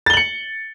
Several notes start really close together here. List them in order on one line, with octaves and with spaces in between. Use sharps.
A6 G7 F#7 C#7